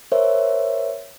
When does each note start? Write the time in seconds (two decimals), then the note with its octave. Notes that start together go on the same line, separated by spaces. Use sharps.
0.12 A#4 C5 C#5 E5